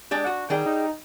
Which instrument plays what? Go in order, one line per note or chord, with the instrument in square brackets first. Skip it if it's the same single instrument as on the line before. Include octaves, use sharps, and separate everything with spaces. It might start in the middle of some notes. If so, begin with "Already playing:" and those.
[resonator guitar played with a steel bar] G#3 D4 G4
F#4
[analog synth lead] D#3 [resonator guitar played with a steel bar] G3 G#4 G5
[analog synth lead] D#4